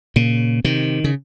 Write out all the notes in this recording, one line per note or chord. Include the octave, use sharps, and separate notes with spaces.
A#2 C#3
C3 D#3
C#3